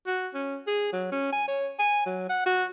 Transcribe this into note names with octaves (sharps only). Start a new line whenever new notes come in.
F#4
C#4
G#4
F#3
C#4
G#5
C#5
G#5
F#3
F#5
F#4